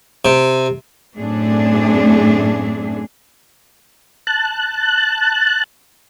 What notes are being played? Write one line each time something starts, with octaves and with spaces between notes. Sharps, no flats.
C3
F#2 A2 A3 C4 D4 G#4
A5 F#6